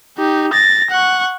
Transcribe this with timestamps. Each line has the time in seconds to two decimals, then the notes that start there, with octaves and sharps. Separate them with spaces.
0.18 D#4 G4
0.53 A6 A#6
0.90 F#5 C#6